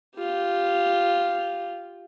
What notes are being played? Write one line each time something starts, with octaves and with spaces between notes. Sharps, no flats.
F4 G4